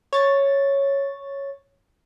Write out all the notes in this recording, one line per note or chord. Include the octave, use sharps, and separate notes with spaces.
C#5 A6